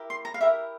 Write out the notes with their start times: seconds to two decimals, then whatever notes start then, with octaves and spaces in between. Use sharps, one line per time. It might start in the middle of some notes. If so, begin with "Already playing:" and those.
Already playing: E4 G4 A#4
0.10 C6
0.25 A#5
0.34 F5
0.41 E4 G4 A#4 E5